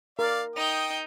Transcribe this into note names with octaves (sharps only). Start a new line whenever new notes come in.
A#4 D5 F5
D#4 G5 D#6 G6